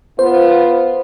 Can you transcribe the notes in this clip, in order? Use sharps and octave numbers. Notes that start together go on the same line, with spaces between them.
B3 F4 C5